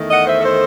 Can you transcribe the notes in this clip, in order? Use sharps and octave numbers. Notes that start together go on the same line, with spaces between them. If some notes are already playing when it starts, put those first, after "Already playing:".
Already playing: E2 D#3 A3
D#5 F#5
C5 E5
A4 C5